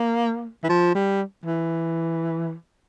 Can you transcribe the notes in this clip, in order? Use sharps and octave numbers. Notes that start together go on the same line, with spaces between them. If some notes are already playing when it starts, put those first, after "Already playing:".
Already playing: A#3
E3
F3
G3
E3